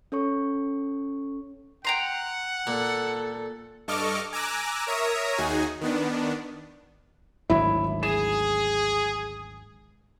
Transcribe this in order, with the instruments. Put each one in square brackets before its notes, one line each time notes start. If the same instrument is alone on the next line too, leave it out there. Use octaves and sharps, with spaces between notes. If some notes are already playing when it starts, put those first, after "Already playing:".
[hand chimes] C#4 A4 C#5 C#6
[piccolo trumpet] F#5 [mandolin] G5 A#5 C6
[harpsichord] A#2 [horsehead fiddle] A4
[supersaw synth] G2 A4 D#5 C#6 D6 F6
G#5 A#5 D6 E6 F#6
A#4 C#5 E5 A#5 D#6
D#2 D#4 F#4 G#4 G#5
D#3 B3 D4
[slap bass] G#1 D2 F#3 [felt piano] E4
[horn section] G#4 [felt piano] E7